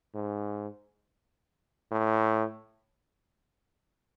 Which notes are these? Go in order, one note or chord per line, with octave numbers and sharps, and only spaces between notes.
G#2
A2